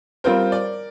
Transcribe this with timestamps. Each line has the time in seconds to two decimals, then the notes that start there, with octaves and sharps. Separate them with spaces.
0.24 G3 C4 F4 A#4 C5
0.52 D5